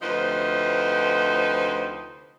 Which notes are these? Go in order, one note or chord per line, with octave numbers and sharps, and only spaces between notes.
D2 C3 F3 D#4 B4 C5